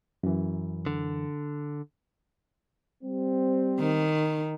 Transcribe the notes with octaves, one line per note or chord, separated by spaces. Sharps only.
F#2 E3
D3
G3 C4
D#3